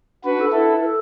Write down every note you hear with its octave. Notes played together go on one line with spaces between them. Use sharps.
D4 F#4 B4
A4
E4 A4 B4
A4